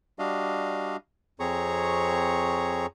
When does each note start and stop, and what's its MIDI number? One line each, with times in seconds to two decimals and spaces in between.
0.19 0.96 55
0.19 0.96 62
0.19 0.96 66
0.19 0.96 75
0.19 0.96 77
1.40 2.86 41
1.40 2.86 60
1.40 2.86 68
1.40 2.86 73
1.40 2.86 82
1.40 2.86 85